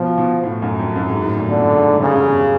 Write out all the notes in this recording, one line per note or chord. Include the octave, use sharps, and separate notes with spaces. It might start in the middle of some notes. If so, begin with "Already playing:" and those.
Already playing: B2 F3
B2
A2
F#2
F2
F#2
G#2
A2
A#2
B2 D3
A2
G#2
G#2
G2 C#3
F#2
E2